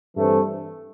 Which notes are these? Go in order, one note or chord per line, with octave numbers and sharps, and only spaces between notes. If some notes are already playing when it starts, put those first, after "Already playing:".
G2 E3 A3 C4